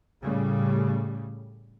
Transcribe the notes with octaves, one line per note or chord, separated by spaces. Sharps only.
A2 C#3 G3